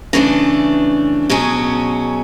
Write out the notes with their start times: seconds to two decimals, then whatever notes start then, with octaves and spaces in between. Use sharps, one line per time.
0.13 C#3 E3 A3 D4
1.29 B2 F#3 C#4 G#4